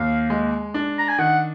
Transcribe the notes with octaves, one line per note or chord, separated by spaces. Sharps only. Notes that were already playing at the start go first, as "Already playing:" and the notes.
Already playing: D#2 F5
G#3
D4
A#5
G#5
D#3 F#5